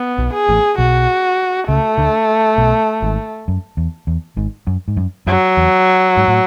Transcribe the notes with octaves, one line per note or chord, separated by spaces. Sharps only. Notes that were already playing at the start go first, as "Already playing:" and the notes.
Already playing: B3
B1 B2
G#4
A1 A2
B1 B2 F#4
C#2 C#3 A3
D2 D3
B1 B2
G#1 G#2
F#2
E2
E2
G#1 G#2
F#2
G#2
F#2
F#2 F#3
E2
G#2
A2